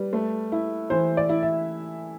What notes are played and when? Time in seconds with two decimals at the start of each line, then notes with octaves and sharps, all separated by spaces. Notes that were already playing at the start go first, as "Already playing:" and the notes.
Already playing: G3 B4
0.13 A3
0.52 E4
0.90 E3 C5
1.17 D5
1.29 E4
1.43 E5